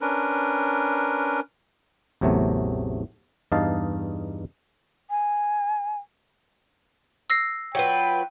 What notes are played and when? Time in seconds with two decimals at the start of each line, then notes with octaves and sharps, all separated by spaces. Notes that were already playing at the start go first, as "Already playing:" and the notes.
0.01 C#4 D4 A#4 B4
2.21 A1 E2 C3 F#3 A3
3.52 E2 G2 D#4 D#5 F5 A5
5.10 G#5
7.30 E6 A#6 C7
7.75 F#3 F4 B4 G5